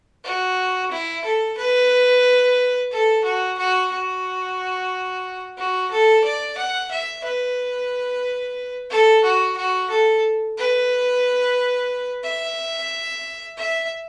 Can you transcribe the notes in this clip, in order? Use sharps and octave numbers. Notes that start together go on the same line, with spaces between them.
F#4
E4
A4
B4
A4
F#4
F#4
F#4
F#4
A4
D5
F#5
E5
B4
A4
F#4
F#4
A4
B4
E5
E5